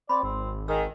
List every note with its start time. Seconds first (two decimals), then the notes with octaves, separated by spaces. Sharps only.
0.09 C4 D5 B5 C6
0.23 G#1 C4
0.68 D#3 G#4 E6